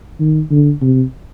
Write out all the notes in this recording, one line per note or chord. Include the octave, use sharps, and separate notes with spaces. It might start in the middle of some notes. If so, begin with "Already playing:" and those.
D#3
D3
C3